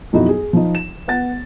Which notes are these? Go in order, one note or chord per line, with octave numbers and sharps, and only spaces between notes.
B1 F2 D#4 E4 F#4
G#4
F3 D#4
E7
B3 F#5 A6